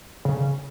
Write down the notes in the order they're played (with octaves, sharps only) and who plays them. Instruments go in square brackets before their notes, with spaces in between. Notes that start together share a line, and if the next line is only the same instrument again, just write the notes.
[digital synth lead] C#3